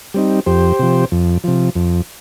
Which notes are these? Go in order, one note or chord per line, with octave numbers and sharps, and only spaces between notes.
G3 C4 D#4
F2 G4 C5
C3 F3
F2
C3 F3
F2